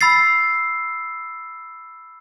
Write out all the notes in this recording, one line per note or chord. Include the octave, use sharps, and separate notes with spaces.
B5 E6 A6 C7